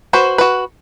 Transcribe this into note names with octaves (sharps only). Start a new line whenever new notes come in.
F#4 B4 C5
F#4 B4